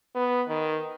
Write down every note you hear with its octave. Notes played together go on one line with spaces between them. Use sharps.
B3
D#3